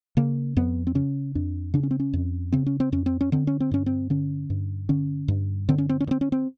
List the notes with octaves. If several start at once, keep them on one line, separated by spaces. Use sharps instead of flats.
C#3 A#3
F2 B3
C4
C#3 C#4
F2 D4
C#3 D4
C#4
C4
C#4
F2
C#3 C4
C#4
C4
F2 C#4
C4
C#4
D3 C4
C#4
C4
G2 C#4
C4
D3 C#4
G2
D3 C#4
G2
D3 C4
C#4
C4
C#4
G2
C4
C#4
C4